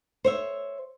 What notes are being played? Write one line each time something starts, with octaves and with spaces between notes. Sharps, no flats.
C5 C#5 E5